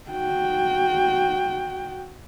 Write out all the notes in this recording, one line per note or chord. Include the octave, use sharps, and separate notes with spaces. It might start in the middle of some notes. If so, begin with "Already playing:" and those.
F#4 G5